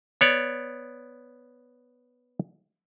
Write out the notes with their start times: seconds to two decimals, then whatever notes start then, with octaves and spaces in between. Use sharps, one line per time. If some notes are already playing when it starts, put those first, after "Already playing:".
0.21 B3 C#5 D5